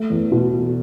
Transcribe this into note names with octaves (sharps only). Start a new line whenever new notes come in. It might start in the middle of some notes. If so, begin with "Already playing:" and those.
Already playing: A3
E2
B2